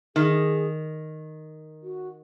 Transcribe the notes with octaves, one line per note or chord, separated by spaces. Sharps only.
D#3 G#4
F#4